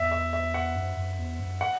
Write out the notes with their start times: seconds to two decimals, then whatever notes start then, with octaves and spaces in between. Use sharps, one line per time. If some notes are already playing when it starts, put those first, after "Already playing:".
Already playing: E2 E5
0.12 E5
0.33 E5
0.54 F#5
0.76 F#2
0.97 F#2
1.18 E2
1.40 F#2
1.61 F#5